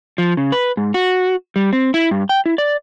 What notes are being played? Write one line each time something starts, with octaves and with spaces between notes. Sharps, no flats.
F3
C#3
B4
G#2
F#4
G3
C4
E4
G2
G5
E4
D5